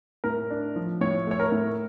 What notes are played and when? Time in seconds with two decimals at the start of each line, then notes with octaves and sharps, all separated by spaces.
0.24 A2 A#4
0.51 D4
0.76 F3
1.01 A2 C#5
1.27 A3 C#5
1.40 A#4
1.52 A2